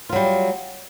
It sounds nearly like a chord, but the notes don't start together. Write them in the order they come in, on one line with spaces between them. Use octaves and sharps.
F4 F#3 G3